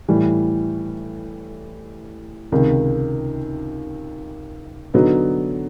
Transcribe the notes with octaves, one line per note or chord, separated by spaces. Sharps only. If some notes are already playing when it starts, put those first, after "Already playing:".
A2 E3 G3
C#2 C3 D#3
D3 F#3 B3 D#4